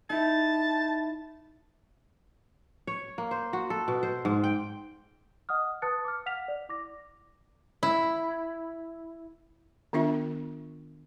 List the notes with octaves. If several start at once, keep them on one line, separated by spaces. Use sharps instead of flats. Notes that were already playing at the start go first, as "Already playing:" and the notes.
D#4 E4 A5
C#5
A#3
C5
F#4
A4
B2
C5
G#2
G5
D#5 F#5 D#6 F6
B4 A5 D#6 F#6 A6 C#7
D6 F6
F5 F#5 F6 B6 F7
D5
E4 D6 A#6
E4
D#3 B3 D4 F4 E5